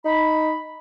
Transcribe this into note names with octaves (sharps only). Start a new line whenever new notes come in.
D#4 B5